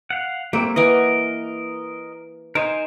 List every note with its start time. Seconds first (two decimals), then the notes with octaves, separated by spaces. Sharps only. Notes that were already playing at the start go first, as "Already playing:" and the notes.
0.10 F5 F#5
0.53 G3 A3 A#3 C4
0.76 E3 A#4 D#5 F#5 G#5
2.55 D#4 A#4 C5 G#5